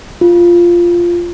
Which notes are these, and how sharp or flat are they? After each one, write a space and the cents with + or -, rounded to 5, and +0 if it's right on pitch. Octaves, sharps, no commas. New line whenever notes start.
F4 -5